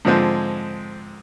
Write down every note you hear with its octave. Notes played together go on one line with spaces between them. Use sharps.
G#2 D3 F3 G#3 C4